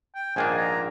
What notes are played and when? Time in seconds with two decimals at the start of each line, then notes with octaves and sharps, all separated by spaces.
0.15 G5
0.36 A#1 G#2 D#3 A#3 D4 G#5
0.58 A#5